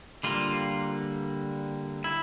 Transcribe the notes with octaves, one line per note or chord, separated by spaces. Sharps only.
D3 G3 A#3 F4
E4